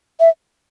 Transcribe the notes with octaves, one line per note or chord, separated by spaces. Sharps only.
E5